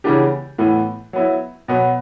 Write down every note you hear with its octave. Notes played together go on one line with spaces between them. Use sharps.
C#3 E3 B3 D4 G4
A2 E3 B3
F#3 B3 E4
B2 F#3 B3